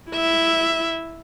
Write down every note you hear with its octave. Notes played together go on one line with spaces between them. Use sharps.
E4 E5